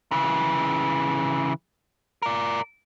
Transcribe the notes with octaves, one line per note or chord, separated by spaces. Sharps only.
C#3 E3
A#4 D5